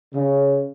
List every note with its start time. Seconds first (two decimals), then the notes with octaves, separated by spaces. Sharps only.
0.14 C#3